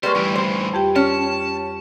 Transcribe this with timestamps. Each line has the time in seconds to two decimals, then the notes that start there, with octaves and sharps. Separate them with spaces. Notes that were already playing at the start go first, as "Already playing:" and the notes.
0.03 G3 G#3 A#3 B4 C5 C#6
0.15 D2 E3 G3 G4
0.36 C5
0.74 F2 G4 G5
0.96 C#4 A5